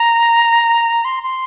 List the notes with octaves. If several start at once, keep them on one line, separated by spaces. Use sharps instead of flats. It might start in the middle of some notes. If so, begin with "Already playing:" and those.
Already playing: A#5
C6
C6